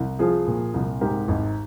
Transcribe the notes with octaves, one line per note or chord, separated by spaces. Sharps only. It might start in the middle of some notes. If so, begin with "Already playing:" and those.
Already playing: C2
F3 F4 G#4
A#2
C2
G#2 G4 A#4
G#1